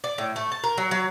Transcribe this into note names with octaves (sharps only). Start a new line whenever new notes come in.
D5
A2
A3
A5
A#4
F#3
F#3